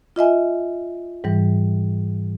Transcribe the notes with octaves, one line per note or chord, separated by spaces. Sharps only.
F4 D#5 E5 G#5
G#2 E3 G3